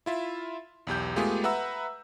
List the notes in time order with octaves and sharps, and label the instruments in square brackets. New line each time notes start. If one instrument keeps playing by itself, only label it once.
[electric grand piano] E4 F4 E5
B1 E2 G4 G6
G#3 A3 B3 F4 G4 G#4
B4 E5 F#5 A#5 E6